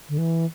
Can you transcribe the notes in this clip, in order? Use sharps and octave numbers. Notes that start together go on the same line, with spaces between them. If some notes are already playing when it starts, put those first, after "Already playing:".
D3
E3